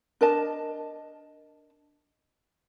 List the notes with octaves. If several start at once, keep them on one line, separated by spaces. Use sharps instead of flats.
D4 A#4 D#5 A5